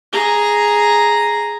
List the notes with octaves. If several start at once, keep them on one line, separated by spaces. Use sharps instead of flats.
G#4 A#5